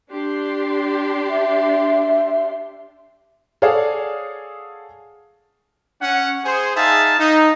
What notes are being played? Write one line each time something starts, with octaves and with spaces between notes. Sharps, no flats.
D4 G4 C6
E5
G#4 A4 C#5 D5 F5 F#5
C#4 F#5
G#4 C5
D#4 G#4 E5 F5 A5
D#4